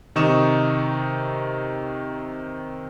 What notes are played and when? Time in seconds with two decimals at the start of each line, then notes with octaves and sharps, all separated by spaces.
0.16 C3 D#3 D#4 C#6 D#6 E7